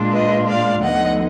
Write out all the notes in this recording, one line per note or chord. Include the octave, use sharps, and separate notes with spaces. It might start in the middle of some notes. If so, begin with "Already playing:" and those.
Already playing: A#2 G#3 D4 F4
B4 D#5
D5 F5
D2 D3 F3 B3 D#4 D#5 F#5